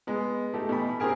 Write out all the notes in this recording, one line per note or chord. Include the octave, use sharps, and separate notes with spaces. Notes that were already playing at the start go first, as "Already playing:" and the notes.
G#3 B3
A3 D#4 G4 A4
B2 E3 B5
C4 C#4 G4 G#4 A#4